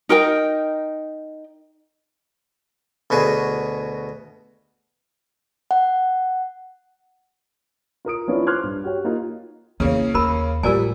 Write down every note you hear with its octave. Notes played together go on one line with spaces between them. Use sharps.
D#4 A#4 D#5 G5
D2 B2 F#4 G#4
F#5
F4 A#4 D#6 D7
F3 B3 C#4 D4 E4 F4
C5 C6 D6 F6 F#6 G#6
G2
F#4 G4 C#5 G5
A#3 D#4 F4 A#4
E2 C#3 A#3 C#4 E4
D#2 A#4 B5
A2 F3 G3 A#4 D5 G#5